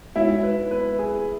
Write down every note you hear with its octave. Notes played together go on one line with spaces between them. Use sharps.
G#3 B3 D#4 E4 F#4 C#5
B4
B4
G#4